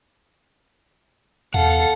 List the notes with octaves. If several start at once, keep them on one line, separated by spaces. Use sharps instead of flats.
E2 A4 F5 F#5